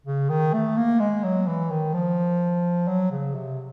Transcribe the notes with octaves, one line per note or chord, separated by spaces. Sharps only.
C#3
D#3
A3
A#3
G#3
F#3
E3
D#3
F3
F#3
C#3
C3